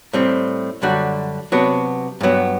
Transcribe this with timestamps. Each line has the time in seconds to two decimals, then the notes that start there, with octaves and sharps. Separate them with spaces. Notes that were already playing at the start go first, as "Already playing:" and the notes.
0.13 A2 G3 C4
0.82 F#2 D3 G3 D4 F#4
1.52 C3 F#3 B3 D4 F#4
2.21 G2 F#3 B3